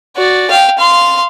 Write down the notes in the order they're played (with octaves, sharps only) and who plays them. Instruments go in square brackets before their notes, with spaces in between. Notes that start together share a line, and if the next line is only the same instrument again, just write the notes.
[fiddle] F#4 D5
F5 G5
F5 C6